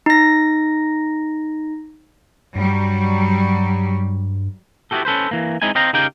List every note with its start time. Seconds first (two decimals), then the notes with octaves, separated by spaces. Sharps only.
0.06 D#4 A#6
2.55 G2 F#3 G3
4.91 B3 E4 F#4 G4 A4
5.05 C#4 A4 B4 C5
5.31 E3 A#3
5.62 G#3 C4 D#4 E4 G#5
5.75 C4 D#5 F5 G5 A#5
5.93 C#3 D#4 G4 A#4 F5 G5